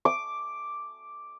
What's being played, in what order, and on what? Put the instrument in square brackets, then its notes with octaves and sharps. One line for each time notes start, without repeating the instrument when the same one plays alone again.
[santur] D6